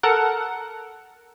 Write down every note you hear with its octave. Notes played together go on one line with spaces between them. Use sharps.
A4 A#4 F#5